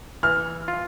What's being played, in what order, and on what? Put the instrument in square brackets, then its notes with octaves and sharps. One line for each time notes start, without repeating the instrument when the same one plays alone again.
[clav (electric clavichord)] E3 [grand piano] F6
[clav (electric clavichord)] F4